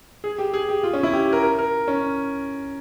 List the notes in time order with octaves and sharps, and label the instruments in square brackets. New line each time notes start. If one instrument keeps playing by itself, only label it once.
[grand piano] G#4
G4
G#4
G4
F4
C#4
E4
G4
A#4
A#4
A#4
C#4